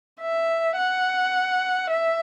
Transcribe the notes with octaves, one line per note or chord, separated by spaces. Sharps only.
E5
F#5
E5